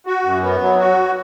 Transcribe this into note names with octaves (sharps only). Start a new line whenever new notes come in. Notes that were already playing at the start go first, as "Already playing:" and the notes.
F#4
F#2
B3
F#3
F#4